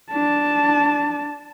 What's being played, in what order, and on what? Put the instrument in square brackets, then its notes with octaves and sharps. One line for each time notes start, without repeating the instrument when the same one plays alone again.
[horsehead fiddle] D4 A5